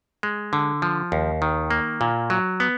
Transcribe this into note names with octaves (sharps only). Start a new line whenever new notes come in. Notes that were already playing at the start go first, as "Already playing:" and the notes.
G#3
D3
F3
D#2
D#3
A#3
A#2
F#3
B3